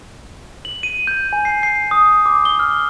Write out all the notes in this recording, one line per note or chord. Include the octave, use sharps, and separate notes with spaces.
F#7
D#7
G6
G#5
C7
C7
D#6
D6
G7
F6